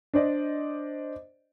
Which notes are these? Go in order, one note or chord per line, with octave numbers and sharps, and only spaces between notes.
D4 C5 D5 D#5